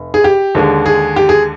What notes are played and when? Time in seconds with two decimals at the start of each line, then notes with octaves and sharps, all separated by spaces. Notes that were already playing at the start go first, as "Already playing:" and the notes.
Already playing: F1
0.14 G#4
0.24 G4
0.55 D#2 D3 G#3
0.86 G#4
1.16 G4
1.29 G#4